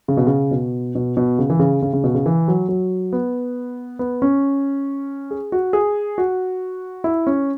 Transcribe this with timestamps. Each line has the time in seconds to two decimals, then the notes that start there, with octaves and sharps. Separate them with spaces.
0.08 C#3
0.17 B2
0.27 C#3
0.51 B2
0.95 B2
1.17 B2
1.39 C#3
1.50 E3
1.59 C#3
1.82 C#3
1.93 C#3
2.04 B2
2.15 C#3
2.26 E3
2.48 F#3
2.68 F#3
3.13 B3
3.99 B3
4.22 C#4
5.31 G#4
5.52 F#4
5.73 G#4
6.18 F#4
7.04 E4
7.27 C#4